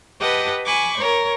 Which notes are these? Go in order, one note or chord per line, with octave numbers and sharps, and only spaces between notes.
G4 B4 D#5 F#5 A5
G#5 B5 C#6 D6
A#4 C#5